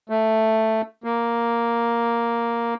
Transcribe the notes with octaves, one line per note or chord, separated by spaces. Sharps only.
A3
A#3